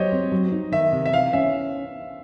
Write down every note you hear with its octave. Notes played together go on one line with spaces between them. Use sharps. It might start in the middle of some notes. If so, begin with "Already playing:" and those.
Already playing: F#3 G4 C5 C#5 D#5
C4
F#3
D#4
D#3 E5
C3
E5
E3 F5
C#4 E5